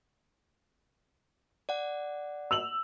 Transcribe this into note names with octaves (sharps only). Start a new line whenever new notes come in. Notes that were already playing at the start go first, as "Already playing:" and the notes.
D5 F#5
E6 F7 F#7